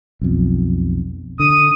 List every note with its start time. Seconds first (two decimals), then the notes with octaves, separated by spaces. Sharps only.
0.21 B1 F2
1.40 D3 D#6